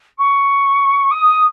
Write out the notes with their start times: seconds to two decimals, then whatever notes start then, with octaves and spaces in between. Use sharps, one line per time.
0.18 C#6
1.11 D#6